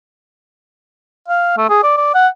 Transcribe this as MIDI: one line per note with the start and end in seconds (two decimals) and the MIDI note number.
1.28 1.57 77
1.57 1.70 57
1.70 1.81 68
1.84 1.95 74
1.98 2.10 74
2.14 2.28 78